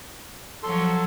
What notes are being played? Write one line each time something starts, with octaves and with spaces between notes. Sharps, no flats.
F3 F#3 A4 C6